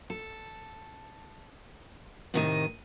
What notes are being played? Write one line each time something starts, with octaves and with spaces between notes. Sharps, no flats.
A4
A2 C3 D#3 D5 D#5